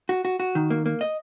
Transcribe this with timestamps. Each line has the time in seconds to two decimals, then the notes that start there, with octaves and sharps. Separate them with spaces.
0.09 F#4
0.25 F#4
0.40 F#4
0.55 D#3
0.70 A#3
0.86 A#3
1.01 D#5